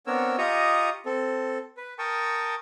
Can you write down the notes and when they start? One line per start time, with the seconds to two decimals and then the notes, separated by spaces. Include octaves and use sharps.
0.07 B3 C4 D4 A#4 C#5 E6
0.38 F4 G4 D#5 A#5 C#6 D#6
1.06 C4 A4
1.77 B4
1.99 A#4 G5 A5 C#6 D#6